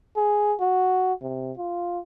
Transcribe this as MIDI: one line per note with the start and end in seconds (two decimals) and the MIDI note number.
0.16 0.54 68
0.60 1.13 66
1.22 1.52 48
1.57 1.99 65